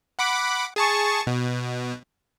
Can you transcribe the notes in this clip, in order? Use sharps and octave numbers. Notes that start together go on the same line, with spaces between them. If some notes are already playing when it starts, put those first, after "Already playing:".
F#5 B5 D6
G#4 A5 C#6
B2